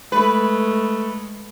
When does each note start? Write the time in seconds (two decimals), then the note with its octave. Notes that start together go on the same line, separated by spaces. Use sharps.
0.12 G#3 A3 B4